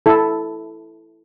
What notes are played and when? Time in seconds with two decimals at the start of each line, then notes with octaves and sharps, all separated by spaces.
0.06 E4 A4